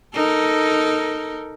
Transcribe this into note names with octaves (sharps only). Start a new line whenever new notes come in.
D#4 A4 A#4